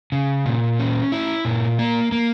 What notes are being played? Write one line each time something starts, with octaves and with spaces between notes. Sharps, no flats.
C#3
A#2
C#4
E4
A#2
A#3
A#3